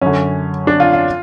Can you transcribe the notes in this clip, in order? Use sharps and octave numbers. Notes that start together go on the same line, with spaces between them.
F#2 D3 C#4
D4
F4
F4